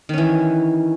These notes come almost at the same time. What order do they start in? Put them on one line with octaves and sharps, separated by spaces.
D#3 C#4 E3